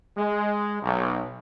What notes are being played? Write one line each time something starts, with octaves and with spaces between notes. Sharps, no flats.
G#3
B1